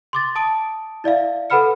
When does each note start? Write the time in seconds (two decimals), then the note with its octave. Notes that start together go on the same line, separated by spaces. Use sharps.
0.13 C6 D6 A6
0.35 A5 D#6 D7
1.04 E4 D5 E5 F5
1.50 A4 B4 F#5 B5 F6 C#7